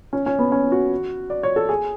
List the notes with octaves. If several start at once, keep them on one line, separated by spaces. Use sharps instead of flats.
C#4
C#4
B3
C#4
F#4
D5
C#5
A4
G#4